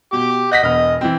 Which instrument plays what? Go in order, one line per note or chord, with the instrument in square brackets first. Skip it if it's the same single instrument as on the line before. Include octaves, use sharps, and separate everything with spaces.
[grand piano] B2 [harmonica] G4 D6
[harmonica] D#5 F#5 [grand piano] G6 A#6 B6
[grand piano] E1 B3 F6 [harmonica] D#5
[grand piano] E3 C4